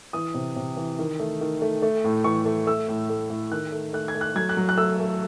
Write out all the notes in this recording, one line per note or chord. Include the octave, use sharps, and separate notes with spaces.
E3 D#6
C3
C3
E3
D#3
A3
D#3
A3
A3
A2
E3 C#6
A3
A3 E6
A2
A3
A2
D#3 F#6
A3
A3 F#6
G#6
A3
F#6
F#3 G#6
F#6
F#3
F#6
A3 E6
A3